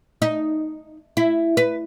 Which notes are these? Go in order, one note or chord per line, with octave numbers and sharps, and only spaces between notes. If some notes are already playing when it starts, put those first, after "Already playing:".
D#4
E4
B4